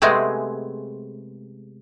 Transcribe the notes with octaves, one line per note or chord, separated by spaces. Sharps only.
C3 G#3 A3 B3 C4 G#4